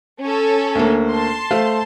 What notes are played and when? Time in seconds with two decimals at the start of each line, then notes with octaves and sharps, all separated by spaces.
0.20 C#4 A4
0.75 D2 A#3
1.11 A5 C6
1.51 A3 C5 F5